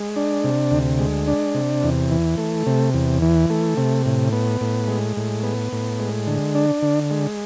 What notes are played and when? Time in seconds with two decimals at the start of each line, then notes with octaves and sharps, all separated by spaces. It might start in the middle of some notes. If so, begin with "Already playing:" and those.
Already playing: G#3
0.16 D4
0.44 C3
0.71 D2
0.99 G#3
1.27 D4
1.55 C3
1.83 E2
2.11 E3
2.38 A3
2.67 C3
2.94 E2
3.22 E3
3.50 A3
3.77 C3
4.06 A2
4.33 B3
4.61 A2
4.88 G#3
5.17 A2
5.43 B3
5.72 A2
6.00 G#3
6.27 D3
6.55 D4
6.82 D3
7.11 G#3